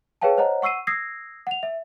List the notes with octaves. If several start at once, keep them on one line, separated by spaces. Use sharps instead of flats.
G#4 B4 C#5 F5 G5 A5
C5 C#5 D#5 F#5 A#5
F#5 C#6 E6 C7 D#7
D#6 E6 G#6 A#6 C7
F#5 F7
E5